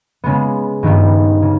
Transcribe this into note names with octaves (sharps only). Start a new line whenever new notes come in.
C#3 G#3 B3
G2 D#3 G3 B3 G4
C#3